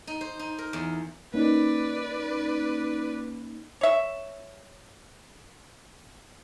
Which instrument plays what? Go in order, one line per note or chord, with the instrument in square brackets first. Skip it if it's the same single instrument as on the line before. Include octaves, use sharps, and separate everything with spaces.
[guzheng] D#4
C5
D#4
A#4
E2
[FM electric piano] A#3 C#4 D#4 [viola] B4 D5
[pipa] C#5 E5